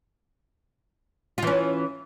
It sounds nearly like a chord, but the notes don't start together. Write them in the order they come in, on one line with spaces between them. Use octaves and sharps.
F4 E3 C#4